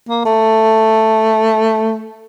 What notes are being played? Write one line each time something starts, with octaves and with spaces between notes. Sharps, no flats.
A#3
A3